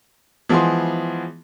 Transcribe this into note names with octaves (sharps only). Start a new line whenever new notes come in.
E3 F3 G#3 B3 G#4 C6